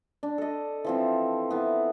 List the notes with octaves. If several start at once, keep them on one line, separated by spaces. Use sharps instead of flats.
D4
A4 D#5
E3 F3 C4
E3 B3